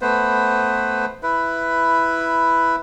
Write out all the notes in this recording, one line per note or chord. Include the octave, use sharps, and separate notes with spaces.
A3 B3 B4 C5
E4 B4